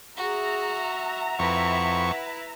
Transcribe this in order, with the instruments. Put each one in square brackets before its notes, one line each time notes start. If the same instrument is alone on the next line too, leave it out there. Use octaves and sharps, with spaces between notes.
[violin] F#4 [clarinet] G#4 [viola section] E5 A#5
[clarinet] F#5
[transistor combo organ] F2 C#6 [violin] E4 B4